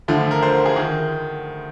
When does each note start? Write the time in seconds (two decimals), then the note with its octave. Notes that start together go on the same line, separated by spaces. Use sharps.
0.08 D2 D3 F3
0.31 A#4
0.42 C5
0.65 G#4
0.76 D#3